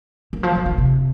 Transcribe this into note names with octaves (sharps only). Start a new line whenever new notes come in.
D#3
F3
D#3
D#3
C3